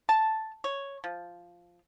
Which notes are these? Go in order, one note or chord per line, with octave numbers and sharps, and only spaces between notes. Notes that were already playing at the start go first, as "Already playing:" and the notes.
A5
C#5
F3